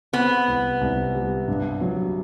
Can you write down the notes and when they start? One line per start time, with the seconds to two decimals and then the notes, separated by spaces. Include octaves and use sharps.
0.13 B3 C4
0.48 C2
0.81 C2
1.15 G3
1.48 G2
1.81 F#3